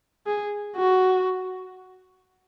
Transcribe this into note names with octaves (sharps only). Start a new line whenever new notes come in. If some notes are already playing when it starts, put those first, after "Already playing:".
G#4
F#4